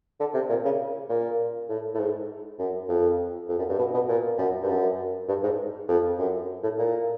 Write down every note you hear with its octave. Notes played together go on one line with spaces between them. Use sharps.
D3
C3
A#2
C#3
A#2
A2
A2
G#2
F#2
F2
F2
F#2
G2
B2
B2
A#2
F#2
G2
F#2
G2
G#2
F2
F#2
A2
A#2